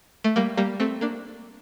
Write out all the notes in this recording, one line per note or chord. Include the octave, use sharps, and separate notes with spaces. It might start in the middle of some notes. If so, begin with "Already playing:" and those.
A3
G3 A#3
G3 A#3
A3 C4
A#3 D4